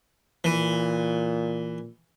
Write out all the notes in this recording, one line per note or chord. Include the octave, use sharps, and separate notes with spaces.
A#2 E3